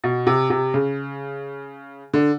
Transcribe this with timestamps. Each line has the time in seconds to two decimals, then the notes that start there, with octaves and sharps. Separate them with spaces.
0.04 B2
0.27 C3
0.50 C3
0.74 C#3
2.14 D3